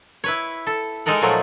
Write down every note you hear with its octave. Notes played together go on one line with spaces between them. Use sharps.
E4 B4 C#5
A4
G#3 D#4 A4 A#4 F#5
A#2 F3 F#3 A3